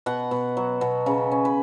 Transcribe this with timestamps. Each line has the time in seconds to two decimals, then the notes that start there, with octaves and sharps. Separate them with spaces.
0.06 B2 F#5
0.31 B2
0.57 F#3
0.81 B2
1.06 C#3
1.32 C#4
1.45 B4